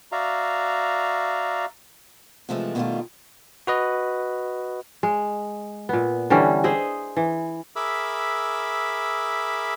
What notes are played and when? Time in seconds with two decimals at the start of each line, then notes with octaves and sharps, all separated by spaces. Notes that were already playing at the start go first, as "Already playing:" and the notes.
0.12 F#4 D5 E5 F5 A#5
2.49 C3 E3 F3 G#3 A3
2.75 B2 D3 D#3 G3 A3 F4
3.67 F#4 B4 D#5
5.03 G#3
5.89 A#2 B3
6.30 D3 E3 G3 C#4
6.64 G#4 C5 D#5 E5
7.17 E3
7.76 G#4 A#4 E5 B5 D6 E6